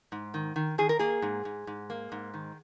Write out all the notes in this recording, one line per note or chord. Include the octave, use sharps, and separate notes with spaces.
G#2
D#3
D#3
D#3 G#4
A#4
A#3 G#4
G#2
G#2
G#2
A#3
G#2
D#3